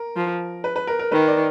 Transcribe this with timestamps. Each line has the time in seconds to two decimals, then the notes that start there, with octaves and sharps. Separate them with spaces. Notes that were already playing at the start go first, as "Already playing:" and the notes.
Already playing: A#4
0.16 F3
0.64 B4
0.76 B4
0.87 A#4
0.99 A#4
1.11 D#3 B4
1.28 D5